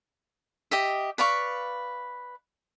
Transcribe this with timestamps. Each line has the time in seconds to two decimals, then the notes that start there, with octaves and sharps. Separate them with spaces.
0.71 G4 D#5 E5
1.18 B4 D5 F5 C#6